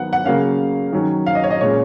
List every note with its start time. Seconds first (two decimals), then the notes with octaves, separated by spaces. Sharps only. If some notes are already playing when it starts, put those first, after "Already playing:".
Already playing: D#3 F#3 B3 F#5
0.13 F#5
0.24 C#3 F#3 A#3 C#4 F5
0.92 D#3 F#3 C#4
1.26 F5
1.35 D#5
1.44 C#5
1.51 D#5
1.61 A#2 G#3 C#4 C#5